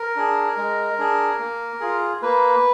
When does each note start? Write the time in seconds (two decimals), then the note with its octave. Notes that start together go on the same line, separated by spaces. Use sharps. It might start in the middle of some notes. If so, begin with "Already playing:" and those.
Already playing: A#4
0.16 D4 G#4
0.57 G#3
0.98 D4 G#4
1.39 A#3
1.80 F4 G#4
2.22 A#3 B4